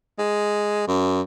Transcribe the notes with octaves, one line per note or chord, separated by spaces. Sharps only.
G#3
F#2